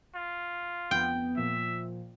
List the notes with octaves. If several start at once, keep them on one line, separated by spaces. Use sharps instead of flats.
F4
F2 B3 G5
A#2 F3 E5